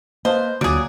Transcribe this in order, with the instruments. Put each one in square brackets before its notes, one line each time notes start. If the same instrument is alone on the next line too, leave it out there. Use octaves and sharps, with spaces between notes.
[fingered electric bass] A#3 [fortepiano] B4 F5 A5 [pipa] C5 [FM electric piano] D#5
[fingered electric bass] D2 D3 [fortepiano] A#2 F#3 [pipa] G3 G#4 [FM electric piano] D6